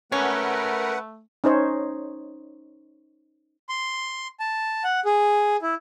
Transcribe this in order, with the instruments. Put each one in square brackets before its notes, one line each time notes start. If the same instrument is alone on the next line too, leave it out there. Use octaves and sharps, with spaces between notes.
[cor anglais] A3 [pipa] C#4 [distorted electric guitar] A#4 G#5 [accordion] B4 F#5
[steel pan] C#4 D#4 C5 C#5
[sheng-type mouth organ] C6
A5
F#5
G#4
E4